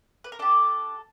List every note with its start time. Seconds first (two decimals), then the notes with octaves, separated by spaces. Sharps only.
0.24 B4
0.32 A#4
0.39 D4 G4 A4